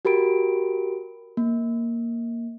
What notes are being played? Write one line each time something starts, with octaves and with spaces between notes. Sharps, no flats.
F#4 G4 A#4 B5 D7
A#3